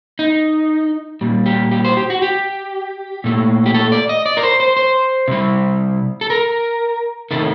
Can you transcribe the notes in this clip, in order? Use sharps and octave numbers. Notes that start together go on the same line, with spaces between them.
D#4
A#2 G3
G4
G4
C5
G4
F#4
G4
A#2 A3
G4
A4
D5
D#5
D5
A#4
C5
C5
C5
C3 G3
A4
A#4
C3 D#3 A3 A4